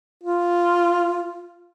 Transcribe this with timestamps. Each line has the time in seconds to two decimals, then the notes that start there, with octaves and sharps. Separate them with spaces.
0.23 F4